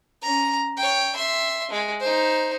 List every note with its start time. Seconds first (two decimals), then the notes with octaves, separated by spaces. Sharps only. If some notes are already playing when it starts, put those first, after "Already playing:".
0.22 C#4 A#5
0.77 C#5 G5
1.15 E5 C6
1.71 G#3
2.00 D#4 C5